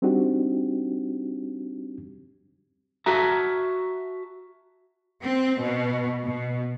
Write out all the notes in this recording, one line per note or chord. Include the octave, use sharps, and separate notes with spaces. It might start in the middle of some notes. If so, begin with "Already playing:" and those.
G3 C4 D4 D#4 F#4 G4
F#4 E5 A5 A#5
C4
B2
B2